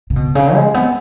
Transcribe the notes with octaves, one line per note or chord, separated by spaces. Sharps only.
C#3
B2
C#3
G#3
B3